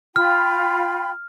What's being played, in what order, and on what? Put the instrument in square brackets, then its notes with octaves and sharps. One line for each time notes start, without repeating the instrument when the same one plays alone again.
[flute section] F4 G5 B5 [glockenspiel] F6